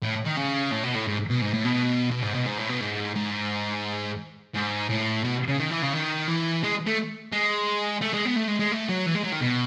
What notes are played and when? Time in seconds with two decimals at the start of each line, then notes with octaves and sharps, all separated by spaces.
0.03 A2
0.26 D#3
0.37 C#3
0.72 A2
0.84 B2
0.95 A2
1.07 G#2
1.30 B2
1.41 G#2
1.54 A2
1.65 B2
2.11 B2
2.23 G#2
2.34 B2
2.46 G#2
2.58 A2
2.69 B2
2.80 G#2
3.16 G#2
4.55 G#2
4.90 A2
5.24 B2
5.48 C#3
5.59 D#3
5.70 E3
5.82 C#3
5.93 D#3
6.28 E3
6.63 G#3
6.86 A3
7.33 G#3
8.02 A3
8.14 G#3
8.26 B3
8.37 A3
8.48 G#3
8.60 G#3
8.72 A3
8.89 F#3
9.06 E3
9.15 G#3
9.24 F#3
9.32 D#3
9.41 B2